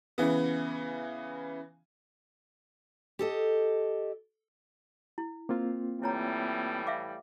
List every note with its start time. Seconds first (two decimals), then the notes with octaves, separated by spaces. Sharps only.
0.18 C#3 E3 B3
3.19 G4 A4 D#5
5.18 E4
5.49 A#3 C4 F4
6.02 A2 E3 G3 E4 C#5 A#5
6.87 E5 F5 D6